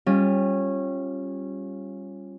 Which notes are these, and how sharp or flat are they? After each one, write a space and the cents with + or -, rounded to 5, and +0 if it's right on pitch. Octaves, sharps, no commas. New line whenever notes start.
G3 +0 C#4 -20 F4 +0